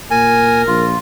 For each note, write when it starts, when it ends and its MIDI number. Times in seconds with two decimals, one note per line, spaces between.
0.11 0.63 46
0.11 0.90 70
0.11 0.62 80
0.67 0.95 34
0.67 0.99 65